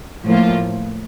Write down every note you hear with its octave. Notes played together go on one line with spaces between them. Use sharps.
A2 F3 A#3 F4